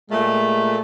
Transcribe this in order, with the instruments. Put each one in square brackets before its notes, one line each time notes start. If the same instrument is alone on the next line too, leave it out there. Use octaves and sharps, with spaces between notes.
[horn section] A#2 G#3 A3